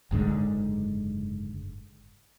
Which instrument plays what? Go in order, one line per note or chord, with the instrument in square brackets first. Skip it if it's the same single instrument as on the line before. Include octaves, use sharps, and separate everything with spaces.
[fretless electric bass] F#1 G#2 D3 G#3